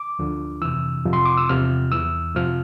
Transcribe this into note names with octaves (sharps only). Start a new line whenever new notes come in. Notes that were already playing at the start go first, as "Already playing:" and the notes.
Already playing: D6
D2 D3 F3
F2 C3 E3 E6
F2 C3 F3
C6
D6
E6
E2 C3 F3 F6
E2 E3 E6
F2 C3 F3 F6